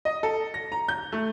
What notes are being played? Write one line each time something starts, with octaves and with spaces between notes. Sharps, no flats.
D#5
A4
A#6
A#5
G6
A3